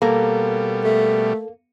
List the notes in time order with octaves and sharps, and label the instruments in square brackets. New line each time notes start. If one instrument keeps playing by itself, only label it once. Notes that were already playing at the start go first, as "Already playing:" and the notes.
[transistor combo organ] B2 G3 [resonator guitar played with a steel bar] A#3 [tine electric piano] A4
[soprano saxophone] A3